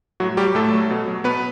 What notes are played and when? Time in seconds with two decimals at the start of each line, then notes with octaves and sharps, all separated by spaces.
0.20 A2 F#3 F#4
0.37 F#3 G3 G4
0.55 A2 A3 A4
0.73 F#3
0.90 B2
1.08 F#3
1.24 B2 B3 B4